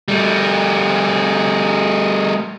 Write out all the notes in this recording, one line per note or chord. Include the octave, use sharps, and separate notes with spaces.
G3 A3